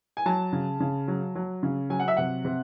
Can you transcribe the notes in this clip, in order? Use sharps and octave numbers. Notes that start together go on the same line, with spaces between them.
G#5
F#3 A5
C#3
C#3
F#3
F#3
C#3
F#3 G#5
F#5
E5
C3 F#5
C3